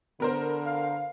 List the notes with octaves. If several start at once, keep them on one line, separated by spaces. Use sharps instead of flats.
D3 B3 A#4 C5
F5